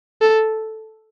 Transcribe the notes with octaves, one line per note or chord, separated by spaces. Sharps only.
A4